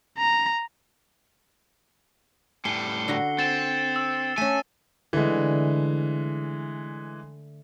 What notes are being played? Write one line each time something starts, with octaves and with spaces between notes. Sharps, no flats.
A#5
A2 G3 G#5 C7 C#7 G7
D3 F#4 A#5
C4 A6 E7
E6
A3 C#4 G#5
D3 E3 G#3 A3